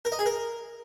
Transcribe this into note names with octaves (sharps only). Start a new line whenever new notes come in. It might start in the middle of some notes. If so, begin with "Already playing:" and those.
A#4
D#5
G#4
A#4